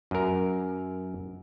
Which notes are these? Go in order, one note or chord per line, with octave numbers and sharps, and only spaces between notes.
F#2 A#4